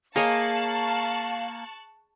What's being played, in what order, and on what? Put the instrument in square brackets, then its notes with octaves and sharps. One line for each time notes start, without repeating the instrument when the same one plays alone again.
[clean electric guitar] A#3 [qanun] G#4 C#5 D#5 [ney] F5 [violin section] A5 C#6 F#6